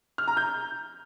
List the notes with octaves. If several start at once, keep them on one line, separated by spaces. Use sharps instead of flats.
F6
A#5
G6